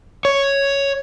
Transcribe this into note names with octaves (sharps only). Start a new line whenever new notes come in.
C#5